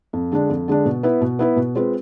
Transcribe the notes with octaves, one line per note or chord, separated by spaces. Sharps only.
F2
D3 G#3 D4
F2
D3 G#3 D4
B2
B3 E4 B4
B2
B3 E4 B4
B2
G#3 C4 F4 B4